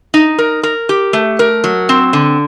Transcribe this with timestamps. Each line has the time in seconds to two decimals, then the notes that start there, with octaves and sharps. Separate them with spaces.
0.14 D#4
0.39 A#4
0.63 A#4
0.89 G4
1.13 A3
1.39 A#4
1.64 F#3
1.89 C4
2.13 D3